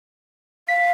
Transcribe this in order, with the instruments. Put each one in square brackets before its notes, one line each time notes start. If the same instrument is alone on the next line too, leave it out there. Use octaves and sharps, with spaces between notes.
[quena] F5 [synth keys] B6